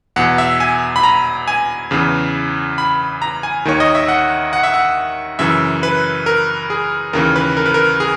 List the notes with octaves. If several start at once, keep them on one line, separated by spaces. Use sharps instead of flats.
E2 B2 F#5
E5
G#5
B5
A#5
G#5
E2 C#3 E3
B5
A#5
G#5
D#2 D#3 C#5
D#5
E5
F#5
F#5
E5
F#5
F#2 C#3 E3 E5
B4
A#4
G#4
D#2 C#3 E3 A#4
B4
A#4
B4
A#4
G#4